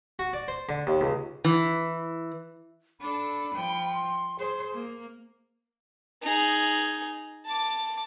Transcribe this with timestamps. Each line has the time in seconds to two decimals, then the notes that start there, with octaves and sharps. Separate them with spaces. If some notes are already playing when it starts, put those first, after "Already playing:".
0.19 F#4
0.33 D5
0.48 C5
0.69 D3
0.87 D#2
1.01 C#2
1.45 E3
3.01 D4 A4 B5
3.55 F3 G5
3.94 C6
4.39 G#4 C5
4.73 A#3
6.22 D#4 G#4
7.46 A5 D6